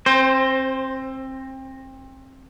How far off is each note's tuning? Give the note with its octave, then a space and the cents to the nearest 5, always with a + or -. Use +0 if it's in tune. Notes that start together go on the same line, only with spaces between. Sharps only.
C4 +25 C5 +0